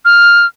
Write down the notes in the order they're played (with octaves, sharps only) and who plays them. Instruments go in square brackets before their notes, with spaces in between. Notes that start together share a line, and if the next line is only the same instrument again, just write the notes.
[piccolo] F6